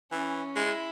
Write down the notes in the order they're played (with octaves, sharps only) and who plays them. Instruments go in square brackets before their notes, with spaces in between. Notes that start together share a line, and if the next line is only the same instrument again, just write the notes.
[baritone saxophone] E3 [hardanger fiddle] C#4
[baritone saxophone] G#3 [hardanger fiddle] E4